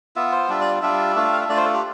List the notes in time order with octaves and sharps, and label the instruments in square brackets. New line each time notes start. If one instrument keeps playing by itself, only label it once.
[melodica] B3 F4 E5
C5
G3 D4 F4 E5
D5
G3 D4 F4 E5
A3 D4 F4
F5
E5
A3 D4 F4 D5
C5
A4
G4